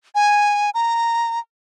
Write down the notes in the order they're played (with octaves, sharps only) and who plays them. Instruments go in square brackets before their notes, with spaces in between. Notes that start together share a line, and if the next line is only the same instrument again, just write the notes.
[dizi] G#5
A#5